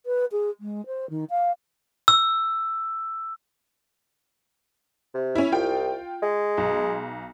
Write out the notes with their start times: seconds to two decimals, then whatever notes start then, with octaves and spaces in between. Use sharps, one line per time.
0.06 B4
0.32 G#4
0.60 G#3
0.86 C5
1.10 D#3
1.30 F5
2.08 E6
5.14 C3
5.35 C#4 E4
5.52 C2 F4 G5
6.22 G#3
6.57 B1